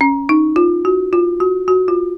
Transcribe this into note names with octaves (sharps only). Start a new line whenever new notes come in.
C#4
D#4
F4
F#4
F4
F#4
F#4
F4